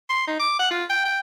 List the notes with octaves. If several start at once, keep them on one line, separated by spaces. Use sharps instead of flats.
C6
D#4
D6
F#5
F4
G5
G5